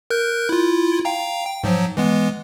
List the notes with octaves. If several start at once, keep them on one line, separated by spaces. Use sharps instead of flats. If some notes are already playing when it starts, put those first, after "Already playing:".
A#4 F#6 G6
E4 F4
F5 G5 A#5
G5
G#2 F3 F#3
E3 G#3 B3